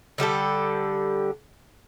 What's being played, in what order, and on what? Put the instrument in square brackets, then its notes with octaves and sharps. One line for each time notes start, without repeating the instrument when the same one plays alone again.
[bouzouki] D3 G3 G4 A4